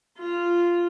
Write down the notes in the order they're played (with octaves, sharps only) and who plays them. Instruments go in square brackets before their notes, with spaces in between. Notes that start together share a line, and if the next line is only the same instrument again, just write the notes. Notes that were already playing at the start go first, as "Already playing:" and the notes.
[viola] F4